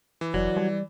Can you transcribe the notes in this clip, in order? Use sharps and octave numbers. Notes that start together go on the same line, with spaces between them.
E3
F1 F#3 D5
G3